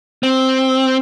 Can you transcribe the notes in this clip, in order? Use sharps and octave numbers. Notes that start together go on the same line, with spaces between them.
C4